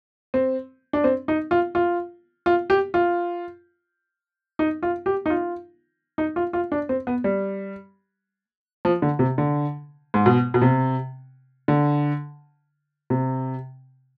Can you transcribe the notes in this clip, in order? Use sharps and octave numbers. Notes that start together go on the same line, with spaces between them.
C4
D4
C4
D#4
F4
F4
F4
G4
F4
D#4
F4
G4
D#4
F4
D#4
F4
F4
D4
C4
B3
G3
F3
D3
C3
D3
G#2
B2
B2
C3
D3
C3